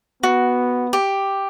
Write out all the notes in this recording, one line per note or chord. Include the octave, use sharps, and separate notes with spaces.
B3 F#4
G4